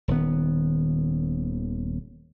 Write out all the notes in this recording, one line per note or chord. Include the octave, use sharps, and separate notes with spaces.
D#1 D#3 B3